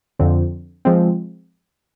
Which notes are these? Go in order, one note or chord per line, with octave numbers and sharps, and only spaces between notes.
F2 D3 F3 C4
F3 G#3 C4